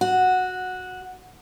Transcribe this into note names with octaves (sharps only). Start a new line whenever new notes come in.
F#4